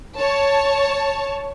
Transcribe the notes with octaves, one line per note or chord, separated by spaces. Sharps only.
C#5 A5